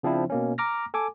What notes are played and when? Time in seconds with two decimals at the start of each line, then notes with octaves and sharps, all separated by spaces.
0.03 C#3 F3 C4 D4 E4
0.30 B2 A#3 C#4
0.58 A#5 D6 F6 A#6
0.94 A4 G#5 D6